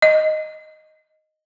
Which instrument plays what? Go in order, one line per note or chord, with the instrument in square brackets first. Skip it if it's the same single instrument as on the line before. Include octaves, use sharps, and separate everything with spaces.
[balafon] D#5